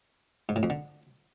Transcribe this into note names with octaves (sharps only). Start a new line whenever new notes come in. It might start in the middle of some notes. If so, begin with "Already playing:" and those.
G#2
A2
F2
D3